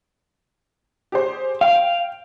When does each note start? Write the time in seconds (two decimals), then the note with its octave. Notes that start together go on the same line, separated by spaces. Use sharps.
1.12 G4 G#4 C5
1.61 F5 G5